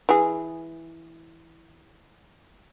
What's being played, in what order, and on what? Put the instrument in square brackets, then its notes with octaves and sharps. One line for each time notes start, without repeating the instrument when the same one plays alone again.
[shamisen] E3 G#4